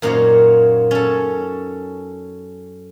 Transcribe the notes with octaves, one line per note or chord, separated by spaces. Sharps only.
F#2 A#2 A#3 D#4 C5 C#5
C#4 A4